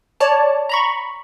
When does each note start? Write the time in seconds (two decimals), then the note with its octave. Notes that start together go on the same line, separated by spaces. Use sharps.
0.20 C#5 D5 A5
0.69 A#5 B5 C#6